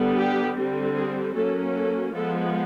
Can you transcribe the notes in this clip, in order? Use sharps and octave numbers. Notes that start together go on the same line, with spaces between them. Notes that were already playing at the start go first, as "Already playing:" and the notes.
Already playing: D3 G3 B3
G4
D3 G3 C4
G#4
F#3 A#3 C#4 A4
A4
F3 G#3 B3 A4